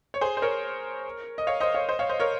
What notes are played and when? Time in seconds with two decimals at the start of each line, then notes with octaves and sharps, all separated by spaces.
0.14 C#5
0.21 G#4 C5
0.37 C5
0.42 A#4 C#5
1.38 D#5
1.47 C#5 F5
1.60 C5 D#5
1.74 C#5 F5
1.89 C5 D#5
1.99 C#5 F5
2.09 C5 D#5
2.20 A#4 C#5